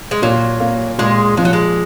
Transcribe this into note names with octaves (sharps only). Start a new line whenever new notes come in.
G#3
A#2 F#3
A#3
A#2 G#3
F3 G#3
F#3
G#3